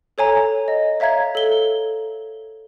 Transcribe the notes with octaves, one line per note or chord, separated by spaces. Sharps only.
A4 C#5 G#5 A#5
D#5
C#5 E5 F5 A#5 G#6
A4 G7